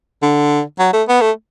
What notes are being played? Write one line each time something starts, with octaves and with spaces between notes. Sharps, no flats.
D3
F#3
A3
B3
A3